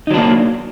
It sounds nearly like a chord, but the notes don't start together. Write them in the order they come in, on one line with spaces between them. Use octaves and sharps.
D#4 F#3 D4 A#3